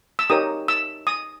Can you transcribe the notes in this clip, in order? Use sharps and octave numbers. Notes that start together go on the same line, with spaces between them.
E6
D#4 G4 A#4 C#5 D#6
E6
D#6